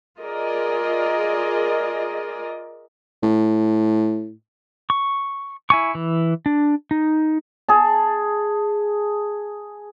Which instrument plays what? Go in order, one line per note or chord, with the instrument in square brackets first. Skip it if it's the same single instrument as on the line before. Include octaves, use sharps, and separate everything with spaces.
[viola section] F4 G#4 A#4 D5 D#5
[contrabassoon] A2
[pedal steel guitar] C#6
E4 G#5 C#6
E3
D4
D#4
[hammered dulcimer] G#4 A5